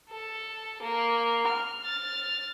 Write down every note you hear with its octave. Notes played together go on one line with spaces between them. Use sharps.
A4
A#3
F6
F6 A6